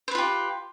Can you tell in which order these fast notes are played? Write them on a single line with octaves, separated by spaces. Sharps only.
C5 B4 F4 G4